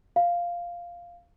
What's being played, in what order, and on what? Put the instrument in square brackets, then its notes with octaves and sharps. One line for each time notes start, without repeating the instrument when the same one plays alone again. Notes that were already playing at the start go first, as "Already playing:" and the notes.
[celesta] F5